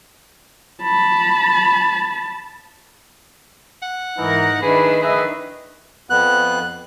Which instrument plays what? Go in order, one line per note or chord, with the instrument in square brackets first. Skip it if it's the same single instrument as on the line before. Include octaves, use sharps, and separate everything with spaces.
[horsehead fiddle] A5 B5
[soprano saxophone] F#5
[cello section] G#2 A#4 [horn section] E3 [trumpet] D#4
[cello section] D#3 D4 E4 [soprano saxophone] G#4 [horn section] B4 [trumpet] B5
[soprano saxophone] G#4 [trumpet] B4 [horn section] D#5 E5
[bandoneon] F2 B3 F#6